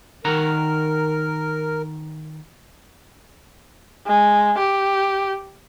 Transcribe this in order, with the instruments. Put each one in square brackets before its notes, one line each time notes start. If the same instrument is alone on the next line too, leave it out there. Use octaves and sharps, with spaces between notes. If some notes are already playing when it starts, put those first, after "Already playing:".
[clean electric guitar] D#3 F#5 A#5 [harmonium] A#4
[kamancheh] G#3
G4